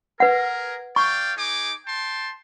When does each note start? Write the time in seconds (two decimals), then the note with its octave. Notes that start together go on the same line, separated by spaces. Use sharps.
0.20 G#4 A#4 B4 F#5
0.96 D5 F5 G5 C#6
1.38 D#4 G#4 D6
1.86 G5 A5 C6